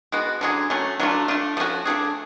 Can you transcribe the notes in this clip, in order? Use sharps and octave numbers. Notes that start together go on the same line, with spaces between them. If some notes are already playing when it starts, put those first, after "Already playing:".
G#3 B3 F#4
D3 F#3 C#4 G#4
F#3 A3 C#4
F#3 A3 D4 F4
A3 D4 F4
F3 A3 C#4 F#4
F3 A3 D4 G#4